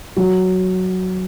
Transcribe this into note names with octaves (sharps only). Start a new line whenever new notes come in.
F#3